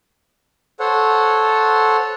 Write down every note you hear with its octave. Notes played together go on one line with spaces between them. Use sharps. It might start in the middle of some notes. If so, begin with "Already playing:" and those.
A4 C5 C#5 F#5